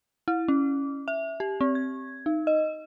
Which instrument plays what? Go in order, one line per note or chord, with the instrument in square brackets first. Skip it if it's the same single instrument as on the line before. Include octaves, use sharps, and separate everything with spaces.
[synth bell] E4
C#4
E5
G4
C4
G#6
D#4
D#5